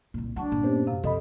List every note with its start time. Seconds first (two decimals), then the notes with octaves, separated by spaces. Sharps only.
0.14 C2 A#2
0.36 F#3 D4 F#5 A5 C#6
0.52 G2 A#2
0.63 A#3 B3 C#4 G4 C5
0.87 F#2 C3 F5
1.03 F2 C3 A4 D#5 B5